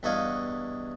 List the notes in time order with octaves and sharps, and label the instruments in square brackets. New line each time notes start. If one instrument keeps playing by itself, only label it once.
[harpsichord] E2 G2 E4 C#5 D#5 F5